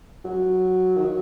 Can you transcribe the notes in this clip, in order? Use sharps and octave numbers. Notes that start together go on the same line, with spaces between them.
F#3
D#3
F#3